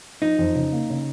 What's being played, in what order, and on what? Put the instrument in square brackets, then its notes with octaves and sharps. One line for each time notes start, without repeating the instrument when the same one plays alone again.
[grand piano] F3 [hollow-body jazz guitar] D#4
[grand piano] F2
C#3
A#3
C#3